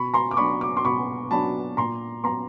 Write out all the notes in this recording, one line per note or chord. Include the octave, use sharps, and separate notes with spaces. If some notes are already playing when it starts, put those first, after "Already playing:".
Already playing: B2 B5 C#6
A#5 C6
D6
F#3 B3 D4 B5 C#6
D6
C6 D6
B2 B5 C#6
F#3 B3 D4 A5 B5
A#2 A#5 C6
F#3 B3 A#5 C6